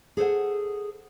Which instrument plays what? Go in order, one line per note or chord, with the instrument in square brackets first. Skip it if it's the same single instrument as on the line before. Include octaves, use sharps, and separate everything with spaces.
[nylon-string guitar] G#4 A4 C5 F#5